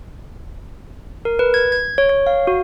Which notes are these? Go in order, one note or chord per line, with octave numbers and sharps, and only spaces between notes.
A#4
B4
G#6
G#6
C#5
C#5
F5
F#4